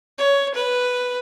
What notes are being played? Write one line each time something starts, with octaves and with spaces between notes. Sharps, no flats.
C#5
B4